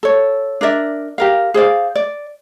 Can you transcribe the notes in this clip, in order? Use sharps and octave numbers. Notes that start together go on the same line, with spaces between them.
A4 C#5
D4 A#4 D5 E5
G4 A#4 F5
G#4 C5 D5 F5
D5